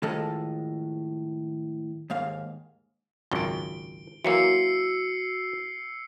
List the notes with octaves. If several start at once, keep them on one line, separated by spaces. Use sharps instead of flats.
A2 D#3 F3 G#3 A4 A5
D#2 G#2 F5
G#1 C#2 F#2 D7 G7
E3 F#3 A#3 F#4 E6 C7 C#7